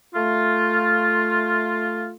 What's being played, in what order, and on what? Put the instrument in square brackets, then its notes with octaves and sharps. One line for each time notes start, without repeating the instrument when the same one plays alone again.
[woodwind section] A3 F4